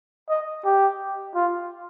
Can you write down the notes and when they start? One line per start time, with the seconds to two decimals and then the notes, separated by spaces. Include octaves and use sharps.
0.30 D#5
0.65 G4
1.35 F4